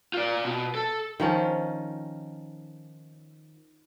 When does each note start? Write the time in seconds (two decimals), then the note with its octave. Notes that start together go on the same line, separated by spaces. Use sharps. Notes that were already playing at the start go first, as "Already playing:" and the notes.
0.13 F4 D5
0.44 B2
0.75 A4
1.20 D#3 F3 C#4